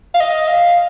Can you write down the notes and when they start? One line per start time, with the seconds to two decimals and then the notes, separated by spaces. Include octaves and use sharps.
0.14 F5
0.20 D#5
0.48 F5